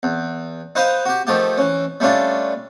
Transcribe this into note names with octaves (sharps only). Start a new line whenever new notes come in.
E2
D#4 B4 C5 D#5 F5
F#4 G4
D#3 F3 A3 G4
E3 C#4
G3 A3 C#4 D4 F4